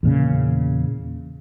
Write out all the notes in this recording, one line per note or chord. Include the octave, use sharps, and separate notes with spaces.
E2 A#2 C#3